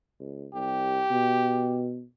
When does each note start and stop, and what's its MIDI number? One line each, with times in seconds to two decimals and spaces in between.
0.20 0.48 37
0.54 1.02 36
0.54 1.87 67
1.11 2.04 47